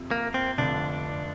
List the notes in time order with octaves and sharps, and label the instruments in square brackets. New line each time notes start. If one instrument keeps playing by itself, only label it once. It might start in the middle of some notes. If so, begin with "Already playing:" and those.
Already playing: [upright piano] F2 C3 F4
[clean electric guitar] A#3
C4
[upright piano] F1 F2 D3 [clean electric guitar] D4